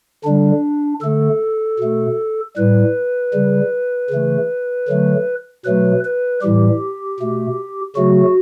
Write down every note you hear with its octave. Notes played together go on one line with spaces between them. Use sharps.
D3 G3 D4
D3 A3 A4
B2 A3
A2 G3 B4
C#3 G3
C#3 E3 A3
D3 F#3 A3
B2 F#3 A3 B4
B4
A2 E3 G3 G4
B2 A3
C#3 F#3 A3 F#4